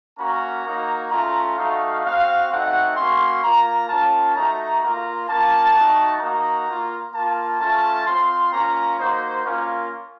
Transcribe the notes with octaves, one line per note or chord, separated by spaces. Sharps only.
A#3 C#4 F#4 A#5
A#3 D#4 F#4
A3 C#4 F4 A#5
A3 D#4 F#4 F5
C4 F#4 F5
A3 C4 D#4 F#4 F#5
A#3 C#4 F#4 C6
A#3 F4 A#5
A#3 C#4 F4 A5
A3 D#4 F#4 A#5
A#3 F4 A#5
A#3 C#4 F4 A5
A3 D#4 F#4
A#3 D#4 F#4 A#5
A#3 F4
A#3 F4 A5
A3 C#4 F4 A5
C4 F4 C6
A#3 C#4 F4 A#5
A#3 D#4 F#4 C5
A#3 C#4 F4 A#4